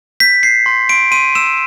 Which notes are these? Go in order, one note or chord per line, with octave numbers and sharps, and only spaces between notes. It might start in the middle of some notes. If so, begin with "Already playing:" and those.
G6 B6
G6 C7
C6
C6 D7
C6 D#7
E6 E7